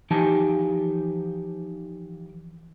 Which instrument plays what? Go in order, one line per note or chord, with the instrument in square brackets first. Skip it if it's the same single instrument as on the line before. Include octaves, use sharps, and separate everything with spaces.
[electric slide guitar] E3 F3 D#4 G4 G#5 A5